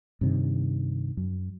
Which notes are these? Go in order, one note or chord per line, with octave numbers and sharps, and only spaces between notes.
G2 C3 D#3
F#2